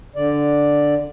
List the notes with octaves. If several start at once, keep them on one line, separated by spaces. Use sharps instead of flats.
D3 D5